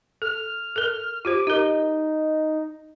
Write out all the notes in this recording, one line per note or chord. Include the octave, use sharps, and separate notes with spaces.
A4 F6
A4 A#4
F4 G4 C5 D6
D#4 G4 A#4